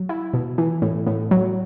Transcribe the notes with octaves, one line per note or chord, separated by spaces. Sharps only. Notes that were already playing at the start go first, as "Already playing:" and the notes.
Already playing: F#3
E4
B2
E3
A2
A2
F#3